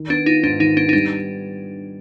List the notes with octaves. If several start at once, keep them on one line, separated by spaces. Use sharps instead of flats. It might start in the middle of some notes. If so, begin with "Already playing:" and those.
Already playing: D#3
B3 D4
D#4 F4
G#2 D4
D#3 D#4
B3 D4
D#4
G3 D4